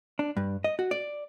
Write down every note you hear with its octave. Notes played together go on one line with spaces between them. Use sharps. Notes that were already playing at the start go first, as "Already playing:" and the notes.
D4
G2
D#5
F#4
D5